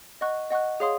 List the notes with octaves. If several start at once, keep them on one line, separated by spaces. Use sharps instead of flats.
D#5 F#5 C#6 F#6
D#5 F#5 C#6 F#6
G#4 C#5 F5 C6 D#6